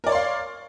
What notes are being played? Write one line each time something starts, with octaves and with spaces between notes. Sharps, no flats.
A#4 C#5 D5 F5 C6